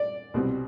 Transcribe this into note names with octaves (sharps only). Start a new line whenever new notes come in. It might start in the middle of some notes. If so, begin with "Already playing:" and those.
Already playing: D5
C2 B2 G3 C4